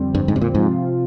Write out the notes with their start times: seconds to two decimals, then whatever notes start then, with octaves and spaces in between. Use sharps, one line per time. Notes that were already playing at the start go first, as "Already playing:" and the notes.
Already playing: F2 D3 G3 C4
0.15 G2
0.28 G#2
0.36 C3
0.41 A#2
0.55 G#2 C3 F3 C4 F4